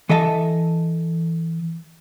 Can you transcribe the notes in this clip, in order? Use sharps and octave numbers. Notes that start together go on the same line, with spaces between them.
E3 A4 D#5 E5 A5